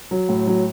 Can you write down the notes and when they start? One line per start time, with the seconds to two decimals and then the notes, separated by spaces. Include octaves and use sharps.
0.11 F#3
0.29 A2
0.47 F#3